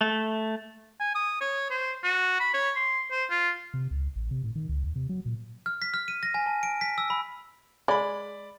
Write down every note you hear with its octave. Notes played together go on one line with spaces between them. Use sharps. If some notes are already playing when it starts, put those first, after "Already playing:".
A3
G#5
D#6
C#5
C5
F#4
B5
C#5
C6
C5
F4
C3
C#2
A1
C3
A2
D#3
C#2
D#2
C3
F#3
A#2
F6
B6
F6
D#7
A#6
G#5
A5
D7
B6
E6
B5
G#3 D5 B5